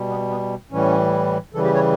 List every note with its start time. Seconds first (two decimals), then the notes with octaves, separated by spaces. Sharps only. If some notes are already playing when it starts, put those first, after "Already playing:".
Already playing: B2 G3
0.09 B3
0.30 B3
0.71 A2 E3 G3 C#4
1.54 C#3 E3 G3 A4
1.65 G4
1.75 C#5